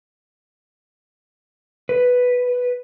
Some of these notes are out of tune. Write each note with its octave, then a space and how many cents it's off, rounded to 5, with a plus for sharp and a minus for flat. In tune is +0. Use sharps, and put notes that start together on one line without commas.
B4 +0